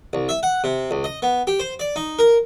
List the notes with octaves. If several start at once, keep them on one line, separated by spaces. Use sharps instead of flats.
C2
E5
F#5
C3
C#2
D#5
B3
G4
C5
D5
D#4
A#4